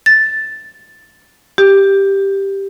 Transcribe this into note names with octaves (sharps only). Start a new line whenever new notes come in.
A6
G4